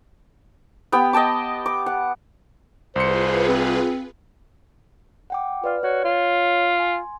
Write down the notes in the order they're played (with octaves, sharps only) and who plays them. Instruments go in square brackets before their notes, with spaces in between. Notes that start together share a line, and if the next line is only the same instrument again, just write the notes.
[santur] B3 G4 G5
D#5 G5 A5 D6
D6
F#5
[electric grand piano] C2 C6 C#7 [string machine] F4 G#4 B4 [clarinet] C5
[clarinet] C4
[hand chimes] F#5 G5 D6
[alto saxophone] F4 [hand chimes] B4 D5 F6
[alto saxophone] F#4 [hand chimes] C#5 G#6
[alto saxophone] F4
[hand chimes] G#5 C6